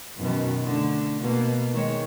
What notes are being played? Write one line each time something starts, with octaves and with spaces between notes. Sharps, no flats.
F#2 B2 D#3
D3 A3
B2 A#3
D#3 G#3 C#5